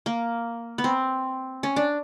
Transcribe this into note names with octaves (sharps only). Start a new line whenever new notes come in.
A#3
B3
C4
C#4
D4